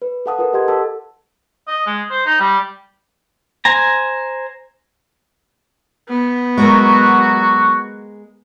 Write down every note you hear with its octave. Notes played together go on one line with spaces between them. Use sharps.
B4
A4 F5 F#5 A5 D#6
F4 A#4 B4
G4 D#5 F#5 C6 G#6
A4 A5 E6
D#5
G#3
C5
D#4
G3
C5 G#5 A#5
B3
F#3 G#3 F#4 A#4